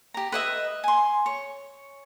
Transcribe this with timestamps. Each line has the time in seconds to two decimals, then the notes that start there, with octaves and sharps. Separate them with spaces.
0.14 G4 A#5
0.32 B4 D#5 E5
0.84 G#5 C6
1.26 C#5